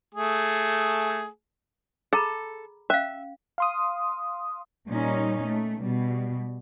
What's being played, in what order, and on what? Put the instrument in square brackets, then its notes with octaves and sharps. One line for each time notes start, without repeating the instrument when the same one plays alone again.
[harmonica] A3 G#4
[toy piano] G#4 A#5 B5 [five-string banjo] A4
[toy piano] C#4 F5 [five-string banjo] E5
[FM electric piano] F5 C6 D#6
[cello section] A#2 G3 C#4 D#4
A3
B2 G3